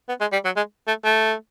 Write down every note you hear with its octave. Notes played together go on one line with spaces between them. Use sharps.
B3
G#3
G3
F#3
G#3
A3
A3